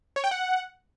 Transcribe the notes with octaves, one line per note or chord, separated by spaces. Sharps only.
C#5
G5
F#5